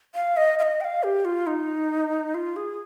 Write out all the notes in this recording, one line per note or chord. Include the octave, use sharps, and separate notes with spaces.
F5
D#5
F5
D#5
G5
F5
G4
F4
D#4
F4
G#4